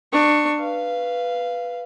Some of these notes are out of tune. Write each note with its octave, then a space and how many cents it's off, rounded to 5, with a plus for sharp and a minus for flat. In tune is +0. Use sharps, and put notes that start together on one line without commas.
D4 +25 C#6 +0
B4 +0 F5 -10